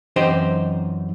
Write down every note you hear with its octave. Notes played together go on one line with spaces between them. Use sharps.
F#2 E3 C4 D#4 G4 C5